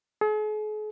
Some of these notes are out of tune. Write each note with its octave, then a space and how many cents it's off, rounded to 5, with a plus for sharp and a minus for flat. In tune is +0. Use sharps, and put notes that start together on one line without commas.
G#4 +45